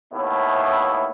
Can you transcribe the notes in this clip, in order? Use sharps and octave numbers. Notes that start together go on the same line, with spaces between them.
D#2 A2 B3 E4